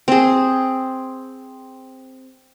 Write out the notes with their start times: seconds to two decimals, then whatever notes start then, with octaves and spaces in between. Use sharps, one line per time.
0.08 C4 G#4